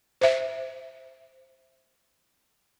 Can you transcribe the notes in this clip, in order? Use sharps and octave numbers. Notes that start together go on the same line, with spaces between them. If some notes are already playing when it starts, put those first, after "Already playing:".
C5 E5